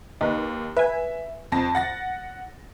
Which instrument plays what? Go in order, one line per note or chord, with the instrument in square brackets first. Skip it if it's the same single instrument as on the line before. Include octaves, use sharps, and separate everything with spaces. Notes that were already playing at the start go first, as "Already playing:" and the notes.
[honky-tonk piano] D#2 [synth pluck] D#4 B4
[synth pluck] B4 G#5 [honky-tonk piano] E5
[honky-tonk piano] F2 A5 A#6
F#5 A6 A#6